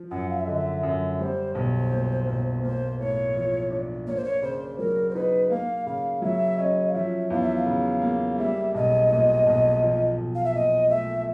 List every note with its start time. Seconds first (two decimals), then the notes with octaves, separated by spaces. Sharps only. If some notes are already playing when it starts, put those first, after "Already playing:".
Already playing: F3
0.11 F#2 F#5
0.29 F5
0.37 E5
0.46 D3 D#5
0.54 E5
0.83 F#2
1.19 G3 C5
1.54 B1 C5
1.91 A#2
2.27 B1
2.63 A#3 C5
2.99 A2 C#5
3.34 F3
3.71 D4
4.07 A#3 C#5
4.16 C5
4.24 C#5
4.42 C#3 C5
4.78 F#3 A#4
5.10 C5
5.14 D#4 B4
5.50 A#3 F5
5.86 C#3 F5
6.22 F#3 E5
6.58 C#4 D#5
6.88 F5
6.94 F3 E5
7.30 E2 F5
7.42 E5
7.56 F5
7.66 C#3
8.02 A#3
8.38 G3 E5
8.74 B1 D#5
9.10 A#2
9.46 B1
9.82 F3
10.17 B1
10.35 F5
10.44 E5
10.54 A#2 D#5
10.90 A3 E5